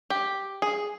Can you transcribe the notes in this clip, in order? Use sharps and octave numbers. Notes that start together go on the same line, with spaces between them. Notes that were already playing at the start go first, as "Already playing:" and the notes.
G4
G#4